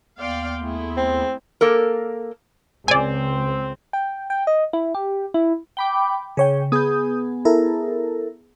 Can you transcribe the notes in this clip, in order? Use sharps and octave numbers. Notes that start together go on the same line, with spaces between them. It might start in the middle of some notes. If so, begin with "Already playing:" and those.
D#2 B3 D5 F5 G5 C6
A3 E4 G#4
C4
A#3 A4 A#4
C#2 C4 D5 G#5
G5
G5
D#5
E4
G4
E4
G5 B5 D6
C#3 G#4 C#5 G5
B3 G#4 D#6 G6
E4 A4 A#4